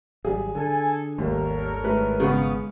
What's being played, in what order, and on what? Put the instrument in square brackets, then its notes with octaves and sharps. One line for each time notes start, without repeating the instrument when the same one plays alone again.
[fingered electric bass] G#1 F#3 G3 [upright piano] G#4
[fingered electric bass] D3 [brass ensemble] A4 G#5
[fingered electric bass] G#1 G3 A3 [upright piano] D#2 [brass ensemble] A4 A#4 C#5
[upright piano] A2 G#3 B4
[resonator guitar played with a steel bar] C#3 B3 [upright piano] G#3 C#6